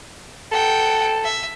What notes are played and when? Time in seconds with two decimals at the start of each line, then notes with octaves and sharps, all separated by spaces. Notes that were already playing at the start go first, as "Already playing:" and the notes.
0.52 A4 F#5 G5
1.24 E5